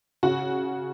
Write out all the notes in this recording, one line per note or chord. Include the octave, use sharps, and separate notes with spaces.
C#3 F#4